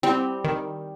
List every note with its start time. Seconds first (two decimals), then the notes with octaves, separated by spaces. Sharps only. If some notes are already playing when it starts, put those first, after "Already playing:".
0.03 G3 C4
0.44 D#3